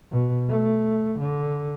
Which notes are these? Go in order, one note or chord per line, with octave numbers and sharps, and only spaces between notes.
B2
A3
D3